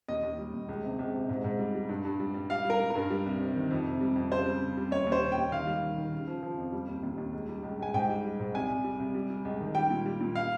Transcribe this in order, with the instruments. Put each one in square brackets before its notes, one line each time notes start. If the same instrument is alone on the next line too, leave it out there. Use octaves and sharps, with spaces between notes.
[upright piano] D#2 D#5
D#2
G3
D#2
C#2
C3
C#2
C3
G#2
G#2
G3
G3
G2
G2
G3
G3
G3 F5
G3
A#4
G3
G2 A#4
G3
C2
C3
D#3
F2
C3
G3
F2
C#3 C5
G3
C#3
G3
D#2 C#5
D#2
C5
C#3
G5
D#2
D#3 F5
G3
D#3
D#3
C#3
F3
F3
F2
G3
D#2
D#2
D#2
C#2
G3
C#2
C#2 G#5
G#2 G5
G3
G3
G#2
C2 G#5
C2
G3
C2
G3
G3
C#2
D#3
G3 G5
A#2
G3
A#2
F5